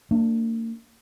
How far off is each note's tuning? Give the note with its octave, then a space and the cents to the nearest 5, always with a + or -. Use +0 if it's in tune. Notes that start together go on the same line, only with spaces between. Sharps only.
A#3 -40 D4 +0